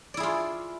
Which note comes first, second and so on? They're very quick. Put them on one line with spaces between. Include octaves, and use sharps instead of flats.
D5 E4 G#4 F4